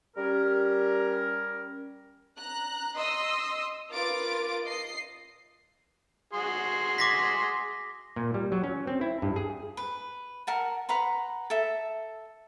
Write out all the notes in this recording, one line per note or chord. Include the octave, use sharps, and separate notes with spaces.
G3 C#4 A#4
A#5 F#6
D#5 C6 D#6 E6
F4 A#4 B4 D6 A6 D7
D#5 C7
F#4 G#4 C6
D6 A#6 B6
A#2
G3
F#3
C#4
C4
E4
G2
G#4
B4
A#4 F#5 A5
B4 F#5 A#5 C6
A4 E5